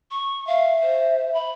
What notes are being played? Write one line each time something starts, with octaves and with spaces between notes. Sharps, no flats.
C#6
E5 F5
C5
B5